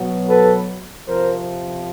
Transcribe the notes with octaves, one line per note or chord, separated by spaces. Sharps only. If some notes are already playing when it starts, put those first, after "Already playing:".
Already playing: B2 F#3 B3
A4 B4
F2 C3 F3 A#4 C5